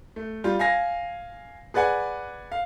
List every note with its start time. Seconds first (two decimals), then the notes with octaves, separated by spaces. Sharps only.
0.16 A3
0.44 G3 F4
0.59 F5 G#5 A#6
1.74 G#4 B4 D5 F#5 G#5
2.52 F5